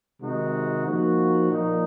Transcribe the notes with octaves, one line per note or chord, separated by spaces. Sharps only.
C3 D#3 G#3 D#4 F#4
F3 A#3 D#4 F#4
A#2 F3 A#3 D#4